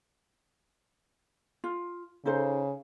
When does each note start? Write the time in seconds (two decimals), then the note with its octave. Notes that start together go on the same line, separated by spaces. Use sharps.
1.64 F4
2.25 C#3 D#4 A4 C5